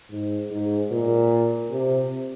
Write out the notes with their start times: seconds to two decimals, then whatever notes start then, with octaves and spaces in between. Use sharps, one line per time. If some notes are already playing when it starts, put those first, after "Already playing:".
0.10 G#2
0.51 G#2
0.91 A#2
1.71 C3